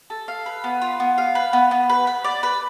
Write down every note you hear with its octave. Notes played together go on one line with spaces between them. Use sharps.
A4
F5
B4
B3
F4
B3
F5
B4
B3
B3
B4
B4
D5
B4